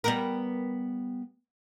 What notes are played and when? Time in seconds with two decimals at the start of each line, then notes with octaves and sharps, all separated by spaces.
0.04 G3 B3 A#4